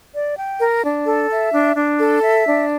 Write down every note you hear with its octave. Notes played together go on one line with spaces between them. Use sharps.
D5
G5
A#4
D4
A4
E5
D4
D4
A4
E5
D4